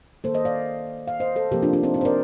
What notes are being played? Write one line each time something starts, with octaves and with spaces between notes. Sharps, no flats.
D#3 A#3 A4 C5
C5 D#5
D5 F5
F5
C5 D#5
A4 C5
C3 F3 A#3 G4 A#4
D4 F4
D4 F4
C4 D#4
C4 D#4
C5
A#4 D5